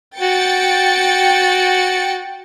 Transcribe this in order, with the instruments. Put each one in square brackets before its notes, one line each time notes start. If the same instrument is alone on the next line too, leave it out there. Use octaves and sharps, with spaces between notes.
[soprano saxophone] F#4 [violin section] G5 A6 C#7